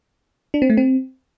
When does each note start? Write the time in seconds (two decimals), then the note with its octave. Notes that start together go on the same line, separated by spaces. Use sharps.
0.54 D4
0.62 C4
0.70 A3
0.77 C4